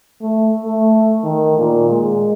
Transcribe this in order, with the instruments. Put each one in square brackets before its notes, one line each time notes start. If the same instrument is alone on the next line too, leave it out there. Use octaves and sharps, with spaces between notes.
[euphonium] A3
A3
D#3
A#2
G#3